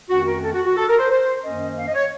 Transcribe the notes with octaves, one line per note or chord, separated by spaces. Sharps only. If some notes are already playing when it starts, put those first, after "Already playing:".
F2 D#3 A3 C#4 F#4
A#4
A4
F#4
F#4
A4
A#4
C5
C5
F#2 D#3 A#3 C#4 D#5
F5
D#5
C#5